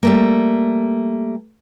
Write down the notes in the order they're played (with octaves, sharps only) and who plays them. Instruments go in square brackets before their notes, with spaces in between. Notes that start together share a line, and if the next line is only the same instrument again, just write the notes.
[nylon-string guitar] G3 A3 A#3